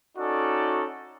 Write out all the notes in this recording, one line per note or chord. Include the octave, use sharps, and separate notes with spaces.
C#4 D#4 F#4 A4 D5